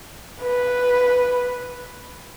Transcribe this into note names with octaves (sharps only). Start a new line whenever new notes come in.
B4